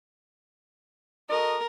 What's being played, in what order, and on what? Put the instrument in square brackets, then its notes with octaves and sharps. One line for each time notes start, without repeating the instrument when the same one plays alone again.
[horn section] F#4 A4 D#5 [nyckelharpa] A#4